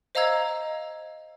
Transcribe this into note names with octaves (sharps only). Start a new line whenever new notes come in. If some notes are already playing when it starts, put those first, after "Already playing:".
C5 D#5 F5 A#5 E6 G#6